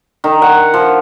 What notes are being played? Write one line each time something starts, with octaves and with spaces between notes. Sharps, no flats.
D#3
F#5
F3